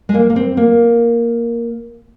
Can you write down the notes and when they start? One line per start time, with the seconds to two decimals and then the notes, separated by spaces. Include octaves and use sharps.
0.09 G#3
0.14 A#3
0.30 A#3
0.36 C4
0.57 A#3